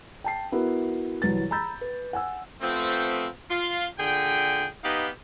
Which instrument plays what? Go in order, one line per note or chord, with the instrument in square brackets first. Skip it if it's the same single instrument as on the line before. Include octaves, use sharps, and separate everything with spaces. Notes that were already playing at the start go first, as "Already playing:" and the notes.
[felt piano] G5 A5 C7
B3 E4 F#4 A#4 B4
C2 E3 F#3 B4 A6
A#5 B5 E6 G6 A6
B4
F#5 G#5 E6
[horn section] F3 A3 B3 C4
F4
A#2 D3 G#4 G5
B3 D#4 G4 B4 D#5 F5